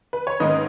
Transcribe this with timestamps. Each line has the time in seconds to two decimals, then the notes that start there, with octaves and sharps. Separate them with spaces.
0.13 B4
0.27 C#5
0.40 G#2 D#3 A#3 C#4 B4 D#5